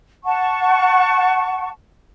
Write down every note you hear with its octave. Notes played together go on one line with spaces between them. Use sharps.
F#5 A5 C#6